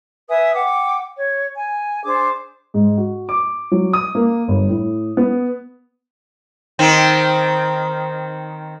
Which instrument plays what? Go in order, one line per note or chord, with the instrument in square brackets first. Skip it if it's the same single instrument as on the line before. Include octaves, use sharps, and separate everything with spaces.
[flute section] B4 E5 G#5 D#6
F#5 G5 D6
C#5
G#5
D4 G#4 C5 D6
[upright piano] G#2
F#4
D6
F#3
D#6
A#3
G1
A2
B3
[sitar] D#3 C4